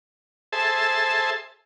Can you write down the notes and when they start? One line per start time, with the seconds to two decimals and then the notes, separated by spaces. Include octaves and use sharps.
0.52 G#4 A4 C5 E5 A5